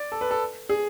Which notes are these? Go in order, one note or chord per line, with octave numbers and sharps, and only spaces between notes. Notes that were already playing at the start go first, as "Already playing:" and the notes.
Already playing: D5
A4
B4
A4
G#4